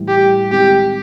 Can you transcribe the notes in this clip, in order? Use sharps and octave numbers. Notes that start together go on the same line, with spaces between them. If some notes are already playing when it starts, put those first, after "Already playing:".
Already playing: A2 E3 G3
G4
D#3 G#3 C4 G4